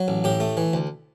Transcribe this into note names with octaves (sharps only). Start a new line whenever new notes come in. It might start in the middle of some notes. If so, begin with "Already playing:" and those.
Already playing: F#3
A1
A2 G4
A3
E3
D2